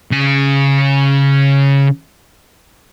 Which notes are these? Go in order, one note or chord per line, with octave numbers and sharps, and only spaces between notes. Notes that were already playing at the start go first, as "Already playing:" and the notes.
C#3 G#5